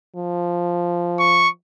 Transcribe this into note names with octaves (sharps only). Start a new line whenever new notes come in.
F3
C#6